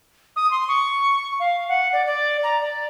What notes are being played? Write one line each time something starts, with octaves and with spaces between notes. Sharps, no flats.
D#6
C6
C#6
F5
F#5
D5
D5
A#5
D5